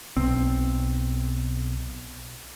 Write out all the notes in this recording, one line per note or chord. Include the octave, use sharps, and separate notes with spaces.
B1 C4